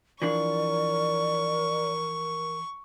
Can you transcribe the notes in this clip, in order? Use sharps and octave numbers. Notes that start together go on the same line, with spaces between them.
E3 F3 D4 A#4 D5 C#6